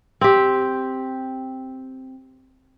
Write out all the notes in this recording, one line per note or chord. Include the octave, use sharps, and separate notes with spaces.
C4 G4